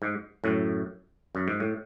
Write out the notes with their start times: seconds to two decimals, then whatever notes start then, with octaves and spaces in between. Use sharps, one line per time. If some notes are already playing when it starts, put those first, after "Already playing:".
0.02 G#2
0.44 F#2 A2
1.35 F#2
1.48 G#2
1.60 A2